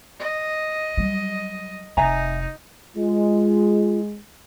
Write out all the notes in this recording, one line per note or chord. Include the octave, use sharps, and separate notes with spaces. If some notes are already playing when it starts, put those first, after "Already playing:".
D#5
F#3 G3
F1 D#4 E5 G#5 A#5
G#3 F4